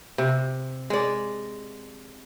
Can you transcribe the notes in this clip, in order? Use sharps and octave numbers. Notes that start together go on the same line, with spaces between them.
C3
G#3 D5